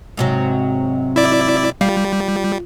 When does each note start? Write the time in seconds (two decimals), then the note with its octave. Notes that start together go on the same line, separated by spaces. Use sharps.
0.17 G#2 C3 F#3
1.16 E4 D5
1.81 G3 F4